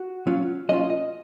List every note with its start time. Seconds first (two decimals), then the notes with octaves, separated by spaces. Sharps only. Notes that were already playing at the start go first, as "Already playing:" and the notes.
Already playing: F#4
0.27 F#3 C#4 F4
0.69 F#3 C#4 F4 D#5
0.90 D#5